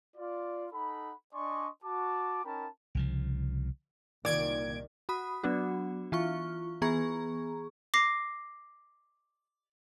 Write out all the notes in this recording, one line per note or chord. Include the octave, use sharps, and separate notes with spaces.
F4 D5
D#4 A4 F#5 B5
D4 D5 D#5 G#5 C6 C#6
F#4 A5 D6
C#4 D#4 A#4 G5 A5 B5
C2 C#3 F3
C2 A#2 D#3 D5 G#6 D7
F#4 B5 D#6
F#3 B3 D4 F#4
E3 F4 C#6
E3 B3 G#4 A#5 C#6
D6 A#6 C7